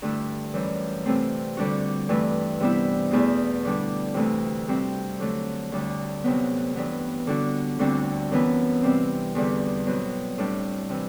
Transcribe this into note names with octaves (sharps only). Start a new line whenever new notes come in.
G2 D3 A3 E4
F#2 E3 G3
C3 E3 A3 C4
D3 G3 D4 F#4
G2 E3 A3
C3 G3 B3 E4
E2 B2 A3 E4
D3 G3 D4
D2 C3 E3 A3
C3 G3 C4 F#4
D3 F#3 A3
D2 D3 G3
D2 C3 F#3 B3
G2 E3 B3
D3 G3 D4 F#4
D2 D3 G3 C4 F#4
F#2 E3 B3
C3 G3 C4
E2 D3 G3
B2 F#3 C4 F#4
A2 G3 D4
C3 E3